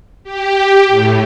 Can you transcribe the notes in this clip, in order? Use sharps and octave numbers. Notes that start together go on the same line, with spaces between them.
G4
A2